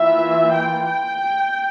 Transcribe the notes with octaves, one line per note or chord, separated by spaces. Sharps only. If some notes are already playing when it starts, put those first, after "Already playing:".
Already playing: E3 A#3 F4 E5
G5
G5